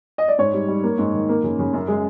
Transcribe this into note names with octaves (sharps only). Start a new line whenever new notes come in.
D#5
D5
G#2 C#5
G3
G3
A#3
G#2
D#3
A#3
C#3
C#3
F#2
G#3